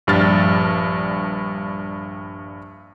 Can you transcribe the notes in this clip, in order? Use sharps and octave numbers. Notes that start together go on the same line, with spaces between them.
A#1 G2 D4 F6 A6